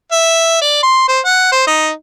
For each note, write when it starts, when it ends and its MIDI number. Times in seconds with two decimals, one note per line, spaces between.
0.12 0.58 76
0.61 0.80 74
0.83 1.04 84
1.08 1.20 72
1.25 1.50 78
1.52 1.65 72
1.67 1.90 63